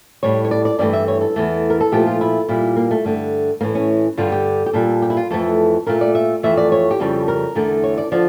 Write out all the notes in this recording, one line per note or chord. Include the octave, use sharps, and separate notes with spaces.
A2 G3 C#5
C#5
D5
D5
G2 E3 A3 D5
E5
C#5
A4
E2 E3 A3
A#4
A4
A#2 F3 A3 G4
F4
E4
A#2 G3 E4
A#3
A3
G2 D3 A3
A2 E3 A3 A#3
C#4
G2 D3 G3 F4
G4
G4
A#2 G3 A4
G4
E4
F4
F2 E3 A3 A4
A#2 A3 A#4
D5
E5
F2 E3 A3 E5
D5
C#5
G4
F2 C#3 G3 A4
A#4
E2 D3 A3
C#5
D5
D3 F3 D5